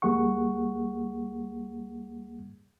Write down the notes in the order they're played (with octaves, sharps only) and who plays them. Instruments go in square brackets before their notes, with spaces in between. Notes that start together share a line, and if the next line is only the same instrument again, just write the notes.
[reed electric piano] D2 G3 A#3 G#4 F#5 C#6